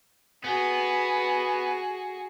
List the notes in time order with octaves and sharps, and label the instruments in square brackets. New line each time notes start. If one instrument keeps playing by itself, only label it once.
[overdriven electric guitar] B3 [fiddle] F#4 G#4